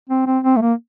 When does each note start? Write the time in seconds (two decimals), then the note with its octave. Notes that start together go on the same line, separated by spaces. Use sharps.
0.10 C4
0.27 C4
0.44 C4
0.57 A3
0.61 A#3